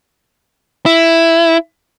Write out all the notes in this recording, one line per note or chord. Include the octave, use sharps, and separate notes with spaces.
E4